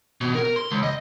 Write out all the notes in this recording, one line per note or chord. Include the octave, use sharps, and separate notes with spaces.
B2
A#4
C6
C#2
D#5